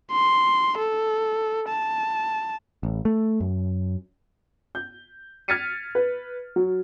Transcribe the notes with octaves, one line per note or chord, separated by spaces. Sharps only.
C6
A4
A5
A1
A3
F#2
G6
F6 G#6 A6 B6 C#7 D#7
B4
F#3